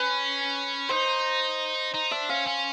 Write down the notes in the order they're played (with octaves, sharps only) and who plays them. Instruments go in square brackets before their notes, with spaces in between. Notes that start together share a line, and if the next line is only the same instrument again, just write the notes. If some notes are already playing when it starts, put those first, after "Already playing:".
Already playing: [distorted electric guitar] C#4 [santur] B4
[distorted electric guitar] D#4 [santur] C5
[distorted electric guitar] D#4
[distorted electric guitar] D4 [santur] E5
[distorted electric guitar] C#4 [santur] F5
[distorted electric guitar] C#4